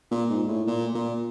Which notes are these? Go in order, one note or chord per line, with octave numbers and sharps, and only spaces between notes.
A#2
G#2
A2
A#2
A#2